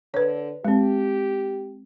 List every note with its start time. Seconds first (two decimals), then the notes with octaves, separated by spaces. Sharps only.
0.14 D3 B4 C#5
0.65 G#3 C4 G4